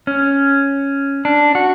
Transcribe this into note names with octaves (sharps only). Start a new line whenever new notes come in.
C#4
D4
F#4